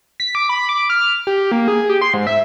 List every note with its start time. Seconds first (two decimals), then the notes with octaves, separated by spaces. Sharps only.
0.20 B6
0.35 D6
0.49 B5
0.69 D6
0.90 F6
1.27 G4
1.52 A#3
1.68 G#4
1.89 G4
2.02 C6
2.14 G#2
2.27 E5